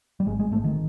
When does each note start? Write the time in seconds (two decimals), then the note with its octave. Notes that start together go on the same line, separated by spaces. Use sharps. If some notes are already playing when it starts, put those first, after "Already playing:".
0.20 G3
0.27 G#1 G#3
0.39 G#3
0.52 G#1 A3
0.64 D#3